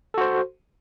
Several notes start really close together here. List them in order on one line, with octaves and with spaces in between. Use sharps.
A4 F#4 C5